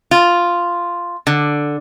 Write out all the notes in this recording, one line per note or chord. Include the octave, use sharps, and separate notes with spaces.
F4
D3